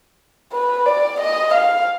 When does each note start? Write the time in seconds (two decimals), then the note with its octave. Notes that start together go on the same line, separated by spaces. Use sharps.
0.52 B4
0.86 D5
1.20 D#5
1.54 F5